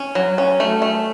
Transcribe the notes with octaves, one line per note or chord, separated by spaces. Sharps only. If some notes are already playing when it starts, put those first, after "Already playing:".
Already playing: C#4
F#3
C#4
A3
A3